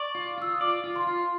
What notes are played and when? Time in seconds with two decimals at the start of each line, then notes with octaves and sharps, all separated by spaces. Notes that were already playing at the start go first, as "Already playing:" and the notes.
Already playing: D5 C#6
0.15 F4
0.38 F4 E6
0.52 D#6
0.61 D5 D6
0.84 F4
0.96 C6
1.07 F4